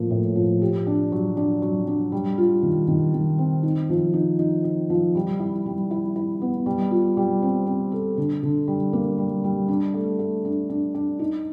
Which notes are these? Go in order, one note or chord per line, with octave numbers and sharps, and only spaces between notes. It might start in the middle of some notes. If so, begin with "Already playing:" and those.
Already playing: A2 F3 A#3
A2
F3
G4
D4
F#3
D4
F#3
D4
G3
F4
D#3
D#3
D#3
C4
D#4
F3
D#4
D#4
D#4
F3
G3
E4
G3
E4
E4
B3
G3
F4
G3
C4
C4
A4
D3
D3
G3
A#3
G3
G3
D4
A3
A3
D4
D4
D4
D#4